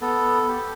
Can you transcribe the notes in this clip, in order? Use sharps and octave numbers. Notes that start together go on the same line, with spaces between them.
B3 A4
G4